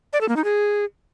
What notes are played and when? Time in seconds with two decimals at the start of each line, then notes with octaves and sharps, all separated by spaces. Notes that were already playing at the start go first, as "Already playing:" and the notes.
0.13 D5
0.21 A4
0.29 A#3
0.36 D#4
0.44 G#4